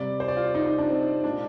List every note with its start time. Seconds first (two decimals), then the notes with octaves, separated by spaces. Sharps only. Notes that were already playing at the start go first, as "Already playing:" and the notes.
Already playing: C3 G3 D5
0.20 C5
0.28 D5
0.37 F4
0.55 D#4
0.66 D#4
0.79 D4
0.90 C4
1.24 A#2 G#3 D4